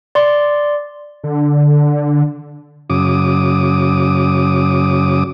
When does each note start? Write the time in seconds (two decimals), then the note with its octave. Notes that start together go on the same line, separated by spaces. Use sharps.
0.15 D5 C6
1.24 D3
2.90 F#2 C#3 D6 D#6